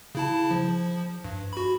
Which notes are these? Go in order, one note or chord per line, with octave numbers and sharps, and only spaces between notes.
C#3 E4 A5
F3
G2
F#4 B5